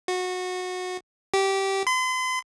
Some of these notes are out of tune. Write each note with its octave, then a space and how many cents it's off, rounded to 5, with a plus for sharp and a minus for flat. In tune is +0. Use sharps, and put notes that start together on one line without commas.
F#4 -20
G4 -15
C6 -40